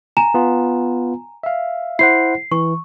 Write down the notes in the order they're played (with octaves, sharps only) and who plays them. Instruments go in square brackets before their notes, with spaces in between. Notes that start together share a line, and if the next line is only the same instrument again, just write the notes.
[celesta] G#5 A#5 E7
[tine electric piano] B3 F4
E5 F5
[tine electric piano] E4 C5 F#5 [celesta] C7
[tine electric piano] E3 [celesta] C#6